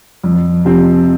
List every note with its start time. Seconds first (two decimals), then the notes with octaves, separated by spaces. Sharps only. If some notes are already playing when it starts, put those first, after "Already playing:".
0.24 F2
0.65 C3 F3 C4